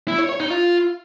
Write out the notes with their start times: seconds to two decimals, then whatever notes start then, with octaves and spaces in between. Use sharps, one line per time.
0.08 E4
0.19 C#5
0.29 C#5
0.40 D#4
0.50 F4